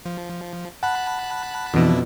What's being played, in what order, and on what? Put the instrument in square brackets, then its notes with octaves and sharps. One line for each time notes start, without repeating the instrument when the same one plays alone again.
[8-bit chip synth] F3
[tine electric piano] F#5 [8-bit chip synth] A5 B5 F#6
[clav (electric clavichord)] F2 B2 [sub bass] E3 [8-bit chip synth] D4 E4